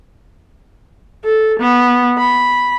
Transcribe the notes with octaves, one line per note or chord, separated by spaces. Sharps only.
A4
B3
B5